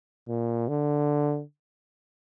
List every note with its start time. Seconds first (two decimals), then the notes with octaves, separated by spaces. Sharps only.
0.29 A#2
0.69 D3